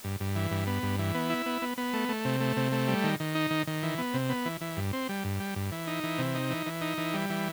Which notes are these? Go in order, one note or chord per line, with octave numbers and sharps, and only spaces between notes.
G2
G2
E3
G2
B3
G2
E3
B3
E4
B3
B3
B3
A3
A3
C3
A3
C3
A3
G3
D#3
D#3
D#4
D#3
D#3
E3
B3
C3
B3
E3
E3
G2
C4
G3
G2
G3
G2
E3
D#4
E3
C3
D#4
E3
E3
D#4
E3
G3
E3